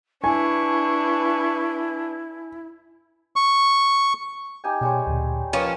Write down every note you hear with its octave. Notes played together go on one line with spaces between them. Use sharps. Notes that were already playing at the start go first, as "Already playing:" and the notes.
D4 E4 B4 G#5 C#6
C#6
D#4 G4 G#5
B2 G3 G#3 C#5 G5
D2 A#2
F3 A#3 C#4 B4 B5